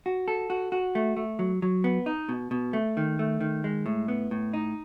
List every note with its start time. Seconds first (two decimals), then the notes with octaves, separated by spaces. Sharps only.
0.06 F#4
0.28 A4
0.50 F#4
0.72 F#4
0.95 A3
1.17 A3
1.39 F#3
1.62 F#3
1.84 B3
2.06 D#4
2.29 B2
2.51 B2
2.73 A3
2.97 D#3
3.19 A3
3.41 D#3
3.64 G#3
3.86 A2
4.08 B3
4.31 A2
4.54 D#4